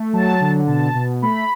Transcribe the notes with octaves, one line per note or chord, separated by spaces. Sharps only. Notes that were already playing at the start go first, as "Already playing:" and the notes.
Already playing: A3
F#3 A5
D3
B2 A5
B2
A3 B5